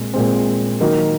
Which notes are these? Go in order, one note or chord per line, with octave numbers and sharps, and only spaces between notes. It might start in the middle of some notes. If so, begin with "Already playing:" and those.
Already playing: A#2 G#3 C4
A#2 G#3 C4
D#3 F#3 A#3 D#4